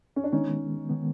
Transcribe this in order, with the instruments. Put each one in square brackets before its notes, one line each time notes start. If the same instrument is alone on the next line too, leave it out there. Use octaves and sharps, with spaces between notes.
[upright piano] C#4
D4
[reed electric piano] D#3 G#3 B3 [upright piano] C#4 D#4
[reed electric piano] D#3 G#3 B3